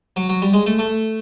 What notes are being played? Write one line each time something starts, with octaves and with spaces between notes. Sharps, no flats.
F#3
F#3
G3
G#3
A3
A3